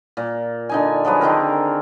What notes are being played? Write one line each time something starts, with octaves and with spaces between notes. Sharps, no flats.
A#2
D3 D#4 G#5
F3 F#3 G#4 B4
D3 D#3 C4 A#4